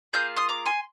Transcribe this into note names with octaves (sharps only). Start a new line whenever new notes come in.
A#3 F4 G#4 D#6 G6
C6 D#6
A#5 D6
G#5 C6